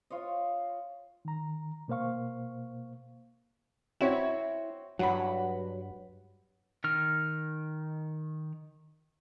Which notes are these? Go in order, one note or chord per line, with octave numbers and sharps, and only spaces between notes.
F4 C#5 D#5
D#3 A#5
B2 A#3 C5 F5 C#6
C4 E4 F#4 C#5
G2 F#3 F#5 B5
D#3 F6